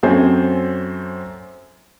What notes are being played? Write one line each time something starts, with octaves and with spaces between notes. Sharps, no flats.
F#2 C4 A4 C5 C#5 G#5